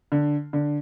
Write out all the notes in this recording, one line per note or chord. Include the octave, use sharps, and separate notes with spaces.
D3
D3